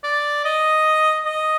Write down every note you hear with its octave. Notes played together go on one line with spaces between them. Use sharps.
D5
D#5
D#5